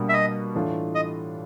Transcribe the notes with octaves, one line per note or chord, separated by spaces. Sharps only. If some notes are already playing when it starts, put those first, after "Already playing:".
Already playing: B2 G3 A#3 D4 F#4
E5
D#5
A2 E3 A3 D4 F4
D#5